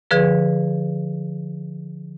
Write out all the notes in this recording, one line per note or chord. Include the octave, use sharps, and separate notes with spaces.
D3 F3 G#4 B4